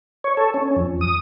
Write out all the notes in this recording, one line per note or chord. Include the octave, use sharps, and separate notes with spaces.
C#5
A4
C#4
F2
D#6